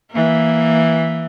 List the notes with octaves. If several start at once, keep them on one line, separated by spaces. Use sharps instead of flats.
E3 A#3